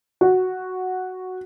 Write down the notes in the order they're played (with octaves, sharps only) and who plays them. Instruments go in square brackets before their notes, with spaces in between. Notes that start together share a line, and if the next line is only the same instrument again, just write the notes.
[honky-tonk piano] F#4